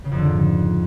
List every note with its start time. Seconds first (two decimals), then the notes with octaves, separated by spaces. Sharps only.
0.05 C#3
0.11 F2
0.18 D3
0.25 G#2